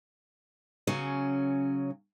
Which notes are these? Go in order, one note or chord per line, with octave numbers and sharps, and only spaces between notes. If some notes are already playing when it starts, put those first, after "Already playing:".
C#3 F#3 C#4